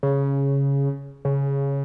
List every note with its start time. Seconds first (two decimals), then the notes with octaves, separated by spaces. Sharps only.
0.03 C#3
1.25 C#3